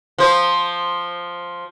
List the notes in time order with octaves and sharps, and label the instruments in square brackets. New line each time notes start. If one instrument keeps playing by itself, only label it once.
[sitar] F3 C5